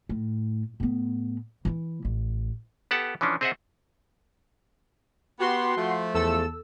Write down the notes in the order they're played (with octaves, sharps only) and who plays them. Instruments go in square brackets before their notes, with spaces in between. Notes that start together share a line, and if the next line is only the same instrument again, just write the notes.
[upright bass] A2
A2 B3
E3 E4
A1
[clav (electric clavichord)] B3 G4 A4 F#5 A5
E3 F3 C#4 D4
C4 G#4 C5 D#5 E5 F#5
[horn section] B3 G4 [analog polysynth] F#4 C6
[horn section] F3 A3
[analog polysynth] E2 A4 E6